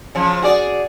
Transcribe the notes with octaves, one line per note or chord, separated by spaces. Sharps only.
C#3 F3
F#4 G#4 D5